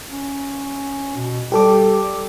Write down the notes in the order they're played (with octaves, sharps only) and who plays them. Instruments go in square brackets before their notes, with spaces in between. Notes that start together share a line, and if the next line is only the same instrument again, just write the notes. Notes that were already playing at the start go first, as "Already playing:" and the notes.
[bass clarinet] C#4
B2
[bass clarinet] G3 [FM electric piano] G4 A4 D6